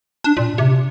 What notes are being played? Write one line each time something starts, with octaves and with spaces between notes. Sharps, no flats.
D4
A#2
C3